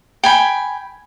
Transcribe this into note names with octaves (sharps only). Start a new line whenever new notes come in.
G5 G#5 B5